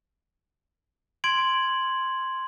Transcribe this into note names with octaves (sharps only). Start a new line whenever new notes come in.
C6 G#6 D7 F#7